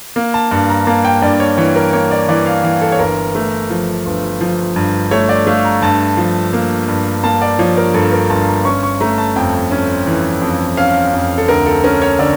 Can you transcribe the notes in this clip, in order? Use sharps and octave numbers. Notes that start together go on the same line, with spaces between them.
A#3
A5
G2 A5
A#5
A#3 A5
G5
G2 D5
C#5
E3 C#5
A#4
A#3 C#5
D5
E3 D5
F5
E3 F5
A4
C#5
G1 A#4
A3
F3
G1
F3
G2
A3 C#5
D5
A3 F5
A#5
G2 A5
F3
A#3
G2
A#3 A5
D5
F3 C#5
A#4
G2 A4
A#4
G1 A5
A#5
C#4 C#6
C#6
A3 A#5
A5
F2 G5
C#4
E3
F2
C#4 F5
F2
A4
D2 A#4
A4
C#4 A#4
C#5
D3 D5